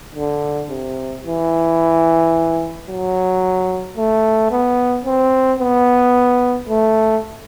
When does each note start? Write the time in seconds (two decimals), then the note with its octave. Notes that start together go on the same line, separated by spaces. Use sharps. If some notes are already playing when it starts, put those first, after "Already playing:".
0.15 D3
0.70 C3
1.24 E3
2.88 F#3
3.97 A3
4.51 B3
5.05 C4
5.60 B3
6.69 A3